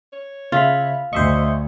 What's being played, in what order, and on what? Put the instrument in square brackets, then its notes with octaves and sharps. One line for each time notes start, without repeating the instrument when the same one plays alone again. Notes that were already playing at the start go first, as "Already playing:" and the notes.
[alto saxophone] C#5
[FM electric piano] C#3 E5 B5 [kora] F4
[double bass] D2 [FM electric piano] C5 E5 C#6 [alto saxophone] D#5